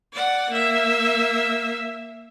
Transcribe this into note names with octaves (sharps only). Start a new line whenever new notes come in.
D5 F#5
A#3 E5